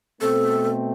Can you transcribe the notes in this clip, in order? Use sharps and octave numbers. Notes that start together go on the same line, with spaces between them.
B2 A3 C4 A4